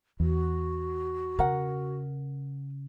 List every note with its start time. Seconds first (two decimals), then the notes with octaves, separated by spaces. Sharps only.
0.20 E2 F#4
1.39 C#3 A#4 F#5